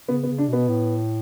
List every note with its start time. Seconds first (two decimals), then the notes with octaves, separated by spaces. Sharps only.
0.08 C#3 B3
0.23 B3
0.29 C#3
0.38 D4
0.48 B2 B3
0.68 A2